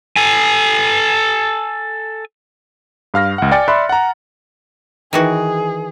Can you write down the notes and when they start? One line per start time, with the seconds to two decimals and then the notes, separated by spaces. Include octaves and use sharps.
0.16 A4 G#5
3.14 G2 F5 F6 A#6
3.38 C#2 F#5
3.51 D5 G5 G#5 A6 C#7
3.68 D5 E5 B5 C6 F#6
3.89 F#5 A#5
5.13 D#3 E3 F#4 G#4